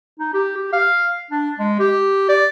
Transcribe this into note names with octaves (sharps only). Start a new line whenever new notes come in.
D#4
G4
G4
F5
D4
G#3
G4
D5